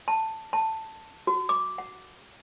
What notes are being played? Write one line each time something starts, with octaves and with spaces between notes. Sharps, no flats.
A5
A5
F#4
D6
F#5